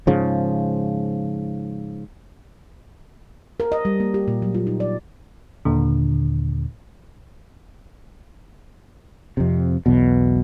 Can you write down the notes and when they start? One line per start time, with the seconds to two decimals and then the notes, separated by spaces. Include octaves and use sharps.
0.07 G#2 C#3 F3
3.60 A#4
3.72 D#5
3.85 G3
4.00 A#3
4.14 G4
4.28 A#2
4.42 F#3
4.54 F4
4.67 D#4
4.80 D5
5.65 D#2 A#2 D3
9.37 F2 C3
9.86 B1 E2 B2